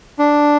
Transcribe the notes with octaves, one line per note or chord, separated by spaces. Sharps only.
D4